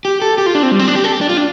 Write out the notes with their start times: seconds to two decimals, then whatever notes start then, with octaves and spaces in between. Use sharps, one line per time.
0.05 G4
0.22 A4
0.38 G4
0.46 F4
0.55 D4
0.63 C4
0.71 G3
0.79 C4
0.88 D4
0.96 G4
1.04 A4
1.13 G4
1.21 D4
1.29 F4
1.37 D4